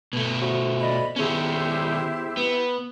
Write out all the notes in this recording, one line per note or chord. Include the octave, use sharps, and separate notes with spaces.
B2 A3 B3
F#4 C5 E5
D5 D#5 B5
D#3 B3 C#4 E4 G4 G#4 C5
B3 B4